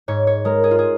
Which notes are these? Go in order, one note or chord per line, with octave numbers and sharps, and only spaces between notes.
G#2 C#5
C#5
G#3 A#4
G#4
F4
G#4